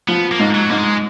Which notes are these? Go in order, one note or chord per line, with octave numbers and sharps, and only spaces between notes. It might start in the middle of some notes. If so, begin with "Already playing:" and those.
F3 B3
A#3
G#2
F#3
G#2 A#3
G#3